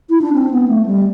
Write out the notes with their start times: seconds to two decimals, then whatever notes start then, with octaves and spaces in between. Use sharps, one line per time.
0.10 E4
0.21 D4
0.33 C4
0.51 B3
0.68 A3
0.86 G3